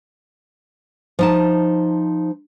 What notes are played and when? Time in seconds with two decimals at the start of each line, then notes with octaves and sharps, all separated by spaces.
1.19 F3 D#4 A5